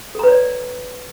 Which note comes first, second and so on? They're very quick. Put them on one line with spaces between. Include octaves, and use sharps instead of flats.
A4 A#5 B4 C#5 D5